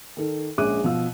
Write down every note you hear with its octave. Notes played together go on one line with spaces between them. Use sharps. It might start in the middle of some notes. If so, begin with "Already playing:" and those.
D#3 A4
A#1 G#3 C#4 D6 F#6 D#7
B2 F3 F5 E6